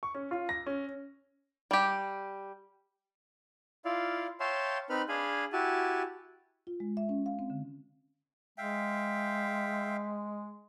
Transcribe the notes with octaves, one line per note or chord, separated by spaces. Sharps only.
C#6
C#4
F4
A#6
C#4
G3 G4
E4 F4 D5 F5
C#5 E5 F5 G5 A5 C6
C4 D#4 B4 B5 F6
D4 G#4 F5 G#5 B5
E4 F#4 G4 G#5 A5
F4
G#3
E5
C#4
F5
C4
D3
G#3 E5 F5 G5